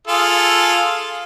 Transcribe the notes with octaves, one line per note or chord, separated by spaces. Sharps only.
F4 G#4 A4